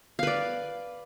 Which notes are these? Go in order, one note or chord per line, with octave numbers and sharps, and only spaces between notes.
B4 D5 F5